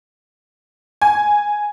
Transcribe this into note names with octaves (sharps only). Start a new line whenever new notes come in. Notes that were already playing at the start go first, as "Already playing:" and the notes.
G#5